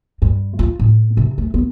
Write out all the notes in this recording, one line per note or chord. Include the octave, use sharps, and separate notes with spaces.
G2
F4
A2
C3
A3
B3